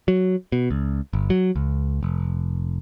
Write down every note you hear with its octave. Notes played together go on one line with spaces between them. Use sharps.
F#3
B2
C#2
G1
F#3
C#2
F1